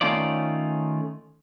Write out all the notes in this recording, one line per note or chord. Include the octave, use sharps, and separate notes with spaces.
D#3 A3 C#4 D#4 F4 D5